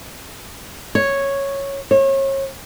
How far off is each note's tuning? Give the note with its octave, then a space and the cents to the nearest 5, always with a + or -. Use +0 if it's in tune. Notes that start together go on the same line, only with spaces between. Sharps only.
C#5 -5
C#5 -35